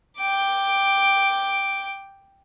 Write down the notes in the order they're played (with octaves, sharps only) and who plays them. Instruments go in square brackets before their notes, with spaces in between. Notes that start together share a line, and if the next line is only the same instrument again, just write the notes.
[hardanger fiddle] G5 D6